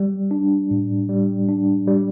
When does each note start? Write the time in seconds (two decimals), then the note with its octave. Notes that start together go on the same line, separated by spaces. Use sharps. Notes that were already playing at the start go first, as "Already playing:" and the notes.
Already playing: G3
0.31 D4
0.71 A2
1.09 G3
1.48 D4
1.87 G3